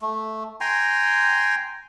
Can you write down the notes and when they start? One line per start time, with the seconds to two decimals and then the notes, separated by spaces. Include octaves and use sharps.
0.02 A3
0.61 G5 G#5 A#5 C6